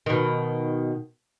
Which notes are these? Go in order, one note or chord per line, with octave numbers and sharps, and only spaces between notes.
B2 D#3